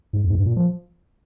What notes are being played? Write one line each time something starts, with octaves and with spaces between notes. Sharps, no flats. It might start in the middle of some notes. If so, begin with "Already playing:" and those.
G#2
F2
G#2
G2
A#2
F3